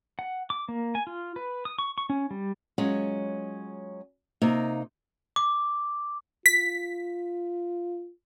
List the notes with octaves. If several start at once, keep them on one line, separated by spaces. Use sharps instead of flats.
F#5
D6
A#3
G#5
F4
B4
D#6
C#6
C#6
C#4
G3
F#3 G#3 C#4 F4 G#4
C3 A#3 D#4 F4
D6
F4 B6